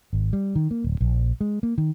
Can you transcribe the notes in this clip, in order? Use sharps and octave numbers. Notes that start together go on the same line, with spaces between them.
G#1
G3
D#3
A#3
D1
A#1
G#3
A#3
D#3